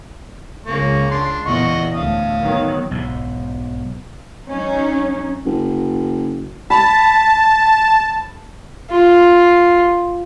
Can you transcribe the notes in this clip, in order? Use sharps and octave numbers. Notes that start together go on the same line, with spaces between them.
C#2 C#3 A#3 C#6
D4 C6
E2 A#2 D#5 F#5 C#6
D2 A2 F5 D#6
D#3 F#3 B3
B1 G#2
F#3 C#4 D#4
F#1
A5 B5
F4